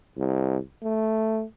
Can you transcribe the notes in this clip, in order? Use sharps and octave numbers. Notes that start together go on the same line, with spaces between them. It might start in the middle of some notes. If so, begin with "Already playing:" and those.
C2
A3